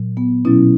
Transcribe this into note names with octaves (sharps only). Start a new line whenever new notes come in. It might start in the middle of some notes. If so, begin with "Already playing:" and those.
Already playing: A#2 F#3
B3
B2 F#3 C#4 E4